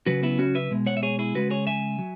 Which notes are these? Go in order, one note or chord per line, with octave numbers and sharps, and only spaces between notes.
C#3 F#3 F#4 B4
B3 E4
C#4 F#4
B4 E5
B2 G#3
C#5 F#5
E5
G#4 C#5
E4 G#4
C#3 G#3 F#4 B4
G#4 C#5
E5 G#5
F#3